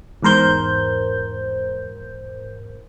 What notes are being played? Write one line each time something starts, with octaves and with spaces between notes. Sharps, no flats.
E2 G#2 A#4 C5 G6